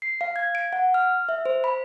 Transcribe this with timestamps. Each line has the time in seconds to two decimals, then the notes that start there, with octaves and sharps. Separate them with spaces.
0.02 C7
0.21 F5
0.36 G#6
0.55 D7
0.73 F#5
0.94 F6
1.29 E5
1.46 C5
1.64 B5